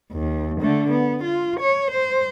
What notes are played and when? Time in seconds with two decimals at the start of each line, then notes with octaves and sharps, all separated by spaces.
0.13 D#2
0.61 D3 A3
0.91 B3
1.23 F4
1.60 C#5
1.91 C5